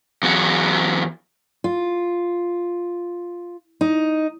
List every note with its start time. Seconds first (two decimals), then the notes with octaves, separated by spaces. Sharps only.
0.23 E2 F#3
1.64 F4
3.81 D#4